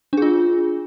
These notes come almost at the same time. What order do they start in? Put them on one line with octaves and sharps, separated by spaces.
D4 G#4 F4